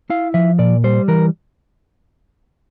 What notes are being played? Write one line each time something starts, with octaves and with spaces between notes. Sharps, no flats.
E4 F5
F3 E5
A#2 D5
G3 C5
E3 A#4